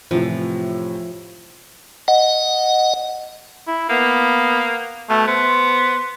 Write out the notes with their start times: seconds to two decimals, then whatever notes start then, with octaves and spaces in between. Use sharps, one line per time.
0.11 A2 C3 E3 F3
2.08 D#5 F#5
3.67 E4
3.90 A#3 B3
5.10 B2 A3
5.27 B3 C5